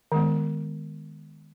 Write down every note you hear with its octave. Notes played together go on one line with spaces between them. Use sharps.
D#3 G#3 B3